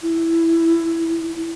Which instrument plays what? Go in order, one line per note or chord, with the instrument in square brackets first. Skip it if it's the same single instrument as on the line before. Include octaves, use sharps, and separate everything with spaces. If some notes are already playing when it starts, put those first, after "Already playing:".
[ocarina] E4